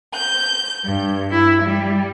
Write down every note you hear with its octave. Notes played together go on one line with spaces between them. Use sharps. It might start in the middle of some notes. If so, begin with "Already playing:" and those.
G6
G2
E4
G3